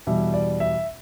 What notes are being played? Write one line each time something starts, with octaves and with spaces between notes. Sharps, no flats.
E2 B2 G3 E5
D5
E5